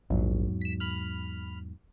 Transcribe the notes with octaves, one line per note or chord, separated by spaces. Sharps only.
A#1 E2 G#2 F#3
B6 E7
B5 F6